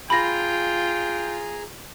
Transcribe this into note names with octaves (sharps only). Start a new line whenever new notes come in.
F4 G#4 G5 G#5 A#5 B5 A#6